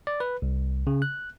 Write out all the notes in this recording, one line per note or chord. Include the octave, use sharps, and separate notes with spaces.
D5
B4
C2
C#3
F#6